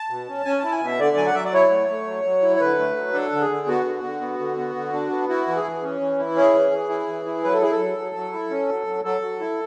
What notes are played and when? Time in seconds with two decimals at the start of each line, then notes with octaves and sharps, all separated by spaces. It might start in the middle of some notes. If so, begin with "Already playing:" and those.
Already playing: A5
0.10 B2
0.28 C#4
0.45 C#4 G#5
0.59 E4 A5
0.72 G#5
0.81 B2 E5
0.99 D3 D5
1.17 F#3 G#5
1.26 F#5
1.35 F#3 E5
1.45 D5
1.53 E4 C#5
1.71 A3
1.89 A3
2.07 F#3
2.25 F#3
2.42 E4
2.56 C#5
2.60 D3 B4
2.79 A3
2.96 F#3
3.14 D4 A4
3.32 D3
3.41 G#4
3.50 D3
3.67 B3 F#4
3.86 D3
4.04 D3
4.21 B3
4.39 D3
4.58 B3
4.76 D3
4.93 D4
5.11 B3
5.29 E4 F#4
5.47 E3
5.56 G#4
5.64 E3
5.83 C#4
6.01 E3
6.19 E4
6.36 C#4 G#4
6.53 E3
6.72 E3
6.89 E4
7.07 E3
7.26 E4
7.44 F#3 B4
7.53 A4
7.62 E4 G#4
7.71 A4
7.79 F#3
7.98 F#3
8.15 F#3
8.33 E4
8.50 C#4
8.69 F#3
8.87 F#3
9.04 F#3 A4
9.22 F#3
9.40 E4